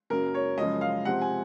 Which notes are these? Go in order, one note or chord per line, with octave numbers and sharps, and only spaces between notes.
F#2 C#3 F#3 A#3 A#4
C#5
F#2 C#3 F3 G#3 D#5
F5
C3 F3 G#3 C4 F#5
G#5